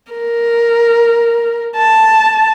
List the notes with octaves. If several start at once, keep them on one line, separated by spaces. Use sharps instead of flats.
A#4
A5